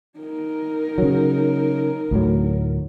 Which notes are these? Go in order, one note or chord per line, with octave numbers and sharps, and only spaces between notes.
D#4 A#4
C#3 F#3
D2 A2 F#3